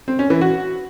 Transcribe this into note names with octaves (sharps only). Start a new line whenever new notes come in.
C4
C#4
E3
F#4